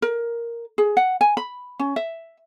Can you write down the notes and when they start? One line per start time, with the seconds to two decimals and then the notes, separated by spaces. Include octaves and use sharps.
0.02 A#4
0.78 G#4
0.97 F#5
1.21 G#5
1.37 B5
1.79 C#4
1.96 E5